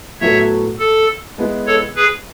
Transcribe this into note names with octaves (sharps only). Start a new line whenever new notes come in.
A2 F#3 B3 F#4 A4 C#5 E5
A4
G#3 B3 E4
A4 C#5
G#4 B4